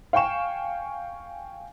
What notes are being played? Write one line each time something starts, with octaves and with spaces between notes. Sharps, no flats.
F5 G5 G#5 C#6 E7